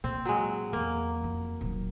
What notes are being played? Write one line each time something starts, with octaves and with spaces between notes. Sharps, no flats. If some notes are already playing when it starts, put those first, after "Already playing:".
A#2 C4
F#3 G#3
E2 A#3
F2
D#1 F#3